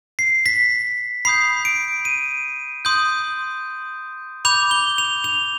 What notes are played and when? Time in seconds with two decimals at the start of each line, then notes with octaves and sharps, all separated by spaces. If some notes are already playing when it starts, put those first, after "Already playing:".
0.19 C7
0.46 B6
1.25 B5 D#6 G6 C7
1.65 D7
2.05 D#7
2.85 C6 D#6 G6
4.45 B5 D6 G6 F7
4.71 G7
4.98 F7
5.24 F7